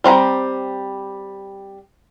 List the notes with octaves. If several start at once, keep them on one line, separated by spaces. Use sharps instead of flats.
G3 C4 F5 A#5